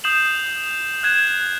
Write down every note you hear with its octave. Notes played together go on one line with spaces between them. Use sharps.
D#6 G6 C7 E7 F#7
F#6 G#6 E7